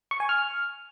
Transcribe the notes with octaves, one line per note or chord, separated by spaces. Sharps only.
C#6
G#5
F6